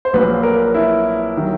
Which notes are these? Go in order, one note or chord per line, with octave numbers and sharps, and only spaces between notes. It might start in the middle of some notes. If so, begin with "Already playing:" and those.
C5
A#1 A#2 F#3 B4
A#4
E4
D#3 F#3